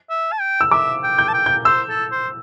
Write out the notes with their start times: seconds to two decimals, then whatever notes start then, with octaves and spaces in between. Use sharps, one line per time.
0.10 E5
0.32 A5
0.40 G5
0.61 E6
0.71 E5 D6
1.03 G5
1.18 G6
1.28 A5
1.34 G5
1.46 G6
1.65 C5 E6
1.89 A4
2.12 C5